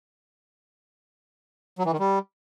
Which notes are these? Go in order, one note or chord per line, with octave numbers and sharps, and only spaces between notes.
F#3
E3
D#3
G3